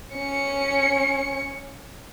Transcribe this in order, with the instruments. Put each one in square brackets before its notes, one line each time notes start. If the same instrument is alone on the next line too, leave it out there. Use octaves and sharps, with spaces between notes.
[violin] C#4 C#7